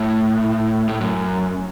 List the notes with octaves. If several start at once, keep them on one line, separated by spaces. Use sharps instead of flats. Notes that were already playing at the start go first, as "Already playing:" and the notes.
Already playing: A2
A2
F#2